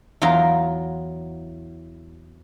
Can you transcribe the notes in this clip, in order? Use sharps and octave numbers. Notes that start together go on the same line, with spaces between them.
E2 F#3 F4 A#4 A#5